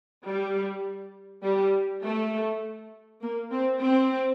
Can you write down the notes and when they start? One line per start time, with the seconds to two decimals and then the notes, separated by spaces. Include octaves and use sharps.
0.25 G3
1.43 G3
2.04 A3
3.22 A#3
3.51 C4
3.81 C4